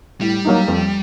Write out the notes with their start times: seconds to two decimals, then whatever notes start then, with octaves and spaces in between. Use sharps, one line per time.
0.21 A2 G3
0.45 F#3 A#3 D#4
0.68 F2